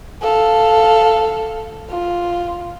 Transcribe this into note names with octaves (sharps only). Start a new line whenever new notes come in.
A4 F5
F4